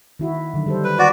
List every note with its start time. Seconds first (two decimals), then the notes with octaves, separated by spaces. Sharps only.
0.19 D#3 E4 F#4
0.54 D3 D#3 F#3
0.66 G3 A4 C5
0.84 B4
0.99 F#4 G4 B4 D5